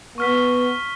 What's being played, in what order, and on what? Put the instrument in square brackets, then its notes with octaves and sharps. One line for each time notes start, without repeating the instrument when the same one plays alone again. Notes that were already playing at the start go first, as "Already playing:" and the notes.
[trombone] B3 [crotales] C#6 F6 B6